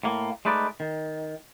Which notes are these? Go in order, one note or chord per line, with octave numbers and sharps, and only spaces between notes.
A2 A#3
G#3 A3 D#4 B4 D5
D#3